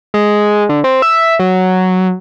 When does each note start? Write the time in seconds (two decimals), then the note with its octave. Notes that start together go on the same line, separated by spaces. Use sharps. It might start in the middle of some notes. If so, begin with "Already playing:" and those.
0.14 G#3
0.69 D3
0.84 C4
1.02 E5
1.39 F#3